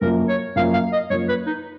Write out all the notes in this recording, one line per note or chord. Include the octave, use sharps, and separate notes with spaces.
F#2 F3 A#3 A#4
C#5
F#2 F3 A#3 F5
F5
D#5
F#2 F3 A#3 C#5
B4
D#4